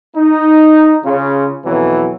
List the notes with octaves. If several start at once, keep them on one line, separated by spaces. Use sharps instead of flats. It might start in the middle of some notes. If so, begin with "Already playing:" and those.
D#4
C#3 F4
F2 B2 E3 F#3